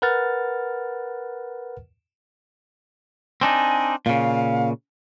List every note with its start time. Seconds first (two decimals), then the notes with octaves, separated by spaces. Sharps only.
0.02 A#4 B4 F#5 F6 A6
3.41 C4 D4 D#4 G#5
4.06 A#2 C#3 F5